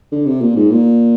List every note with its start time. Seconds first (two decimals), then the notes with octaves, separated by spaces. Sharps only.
0.12 D3
0.26 C3
0.41 A#2
0.56 G#2
0.71 A#2